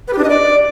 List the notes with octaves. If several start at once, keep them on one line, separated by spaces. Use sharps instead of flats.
B4
G4
D4
D#5
D5